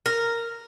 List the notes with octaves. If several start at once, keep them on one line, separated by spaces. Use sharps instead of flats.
A#4